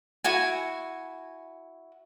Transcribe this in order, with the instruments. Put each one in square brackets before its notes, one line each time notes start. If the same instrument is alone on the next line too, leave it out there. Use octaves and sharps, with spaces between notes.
[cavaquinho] E4 F#4 G#5